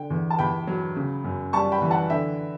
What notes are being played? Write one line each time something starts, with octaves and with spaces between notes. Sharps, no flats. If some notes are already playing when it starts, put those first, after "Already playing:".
Already playing: D3 G5
E2
A5
E2 G5 B5
F#3
C#3
F#2
G3 A5 C#6
G5 B5
E3
F#5 A5
D3 E5 G5